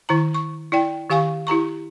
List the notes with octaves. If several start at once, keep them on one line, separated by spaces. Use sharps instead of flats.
D#3 E4 A#5
C#6
E4 D5 G5
D#3 G4 F5 G#5 C#6
E4 G4 A#5 C#6